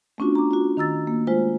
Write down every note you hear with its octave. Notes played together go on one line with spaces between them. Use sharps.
A3 B3 C#4 D4 F4 F#4
A#5 D6
F4 F#4
D#3 A#5 E6 A6
A#3
G#3 A3 F4 C5